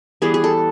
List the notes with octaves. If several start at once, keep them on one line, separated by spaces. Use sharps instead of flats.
E3 G3 B3 G#4
G#4
A4